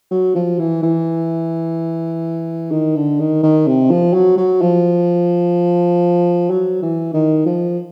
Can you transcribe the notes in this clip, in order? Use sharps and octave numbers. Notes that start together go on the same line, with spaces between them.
F#3
F3
E3
E3
D#3
D3
D#3
D#3
C3
F3
F#3
F#3
F3
F#3
E3
D#3
F3